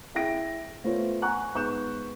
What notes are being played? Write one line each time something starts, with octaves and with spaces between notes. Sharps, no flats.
E4 G#4 E5 G5 A#6 D7
A3 B3 F4 C5 C#5
F#5 G#5 A#5 C#6 F#6
G#2 B3 C#6 F#6 G6 E7